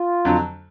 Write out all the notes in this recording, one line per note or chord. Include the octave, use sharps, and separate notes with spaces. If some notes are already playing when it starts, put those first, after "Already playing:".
Already playing: F4
F2 D3 F#3